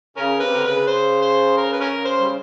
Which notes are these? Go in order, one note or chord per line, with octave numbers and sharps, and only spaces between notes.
C#3 C#4 A#4
C3 B4
D3 A#4
C#3 B4
C5
C5
A#4
B4
C#4 A#4
C5
G3